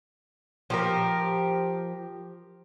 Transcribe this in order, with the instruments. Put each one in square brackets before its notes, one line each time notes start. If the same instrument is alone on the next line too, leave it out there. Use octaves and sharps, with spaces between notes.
[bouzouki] F3 G4 A#4